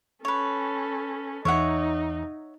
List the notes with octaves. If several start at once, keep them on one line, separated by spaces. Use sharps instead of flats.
C#4 A4 B4 C#5
E2 D#4 C#5 E5 F#5